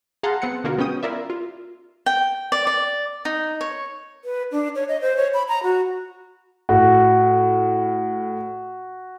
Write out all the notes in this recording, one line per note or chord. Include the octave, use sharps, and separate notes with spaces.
G#4 F5 F#5 A5 A#5 C6
B3 C4 F#5 C#7
B2 D3 A#3 F4 F#4 A#4
G#3 B3 C#4 G5 D#6
E4 F4 A#4 D5 E5
F4
G5
D5
D5
D#4
C#5
B4
D4
C#5
D#5
C5
C#5
B5
A#5
F#4
A2 F#4